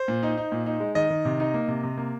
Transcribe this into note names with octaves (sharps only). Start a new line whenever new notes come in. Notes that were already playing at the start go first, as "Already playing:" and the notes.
Already playing: C5
A#2
D#4
D#4
A#2
D#4
G#3
D#3 D#5
D#3
C3
D#4
A#3
C3
C3
A#3